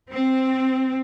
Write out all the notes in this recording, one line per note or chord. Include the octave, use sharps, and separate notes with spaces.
C4